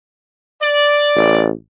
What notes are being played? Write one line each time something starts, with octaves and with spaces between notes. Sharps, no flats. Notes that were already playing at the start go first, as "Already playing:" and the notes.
D5
A1